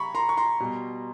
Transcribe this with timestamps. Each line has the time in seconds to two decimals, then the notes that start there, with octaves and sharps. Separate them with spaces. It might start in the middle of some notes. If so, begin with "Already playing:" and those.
Already playing: C#3 G3 A#5 B5 C#6
0.15 A#5 C6
0.29 C#6
0.37 A#5 C6
0.60 B2 G3